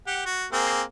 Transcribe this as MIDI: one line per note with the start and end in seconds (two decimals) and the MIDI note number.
0.07 0.23 67
0.07 0.23 78
0.26 0.46 66
0.53 0.82 58
0.53 0.82 60
0.53 0.82 68